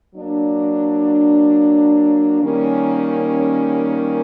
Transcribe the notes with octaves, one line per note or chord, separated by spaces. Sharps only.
F#3 A#3 D4
D#3 G3 A#3 C#4